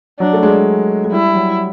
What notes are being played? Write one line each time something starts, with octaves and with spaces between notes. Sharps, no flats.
F#3 D4
A3
G#3
G#3
G3 E4
F#3